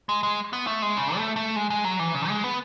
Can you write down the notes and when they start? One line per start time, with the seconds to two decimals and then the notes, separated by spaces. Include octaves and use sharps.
0.09 G#3
0.23 G#3
0.53 B3
0.67 A3
0.82 G#3
0.97 C#3
1.17 A3
1.36 A3
1.56 G#3
1.70 G#3
1.84 F#3
1.99 E3
2.15 C#3
2.28 G#3
2.44 B3